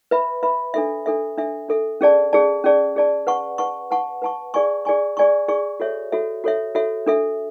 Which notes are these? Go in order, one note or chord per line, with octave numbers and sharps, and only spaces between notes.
B4 E5 B5
B4 E5 B5
D4 A4 E5
D4 A4 E5
D4 A4 E5
D4 A4 E5
C#4 G#4 D5 A5
C#4 G#4 D5 A5
C#4 G#4 D5 A5
C#4 G#4 D5 A5
B4 F#5 A5 C#6
B4 F#5 A5 C#6
B4 F#5 A5 C#6
B4 F#5 A5 C#6
G#4 D5 G#5 C#6
G#4 D5 G#5 C#6
G#4 D5 G#5 C#6
G#4 D5 G#5 C#6
F#4 A4 C#5 E5
F#4 A4 C#5 E5
F#4 A4 C#5 E5
F#4 A4 C#5 E5
D4 A4 E5